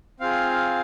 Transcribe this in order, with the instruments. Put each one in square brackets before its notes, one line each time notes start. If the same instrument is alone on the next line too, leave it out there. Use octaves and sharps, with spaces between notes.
[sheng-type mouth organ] C4 F4 G#4 F5